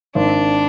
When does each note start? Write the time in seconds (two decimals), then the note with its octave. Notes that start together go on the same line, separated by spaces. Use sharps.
0.15 G#1 D4